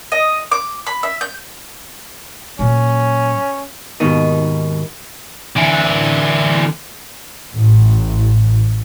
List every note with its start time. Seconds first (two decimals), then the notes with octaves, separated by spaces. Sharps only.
0.12 D#5
0.52 D6
0.87 B5
1.03 E5
1.21 G6
2.59 A#2 F#3 C#4
4.00 D#2 G#2 B2 D#3 D#4
5.56 D3 E3
7.53 A1